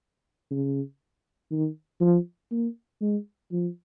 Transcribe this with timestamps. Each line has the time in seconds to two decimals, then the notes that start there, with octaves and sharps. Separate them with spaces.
0.51 C#3
1.52 D#3
2.01 F3
2.51 A#3
3.01 G#3
3.52 F3